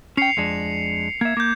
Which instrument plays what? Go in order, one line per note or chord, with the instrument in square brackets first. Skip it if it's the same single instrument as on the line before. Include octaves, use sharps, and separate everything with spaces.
[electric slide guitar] C#4 G5 [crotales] C7 C#7 F7
[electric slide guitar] F2 G#3 D4
[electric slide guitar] A#3 E5 [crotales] G#6
[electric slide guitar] A#3 [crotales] D6 G6